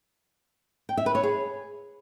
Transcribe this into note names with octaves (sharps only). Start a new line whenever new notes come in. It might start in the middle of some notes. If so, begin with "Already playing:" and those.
G5
E5
B4
C#5
G#4